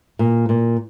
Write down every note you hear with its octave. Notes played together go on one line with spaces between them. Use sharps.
A#2
A#2